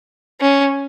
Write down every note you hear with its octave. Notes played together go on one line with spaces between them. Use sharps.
C#4